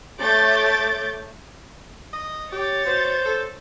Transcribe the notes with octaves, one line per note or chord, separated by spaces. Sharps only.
A3 C#5 D6 G6 A6
D#5
G4 C#5 A6
B2 C5
A4